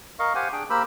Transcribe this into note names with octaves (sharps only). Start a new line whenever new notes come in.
A#4 D#5 F5 C#6
G4 C5 F5 F#5 G#5
D4 G#4 G5
A#3 G4 A#4 C5 B5 E6